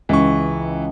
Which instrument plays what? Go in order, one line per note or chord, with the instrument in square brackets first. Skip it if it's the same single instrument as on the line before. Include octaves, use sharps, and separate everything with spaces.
[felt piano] C#2 [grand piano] E3 C#6